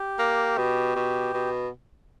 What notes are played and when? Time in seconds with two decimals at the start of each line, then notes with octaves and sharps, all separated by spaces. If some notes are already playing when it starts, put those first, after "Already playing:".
Already playing: G4
0.19 A#3
0.58 B2
0.96 B2
1.34 B2